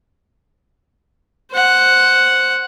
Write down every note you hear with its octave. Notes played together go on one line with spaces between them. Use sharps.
C5 F#5